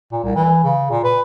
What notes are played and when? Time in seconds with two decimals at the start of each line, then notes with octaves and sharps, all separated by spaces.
0.12 A#2
0.23 C2
0.35 E3
0.64 C#3
0.90 A#2
1.04 B4